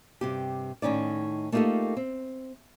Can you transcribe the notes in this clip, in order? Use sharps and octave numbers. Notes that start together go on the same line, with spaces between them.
G2 C3 G4
A2 D#3 C#4 D#4 D5
A3 A#3 D#4 F4 G4 A4
C4